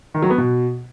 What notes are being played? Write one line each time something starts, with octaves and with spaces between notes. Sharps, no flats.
D#3
F#3
B3
B2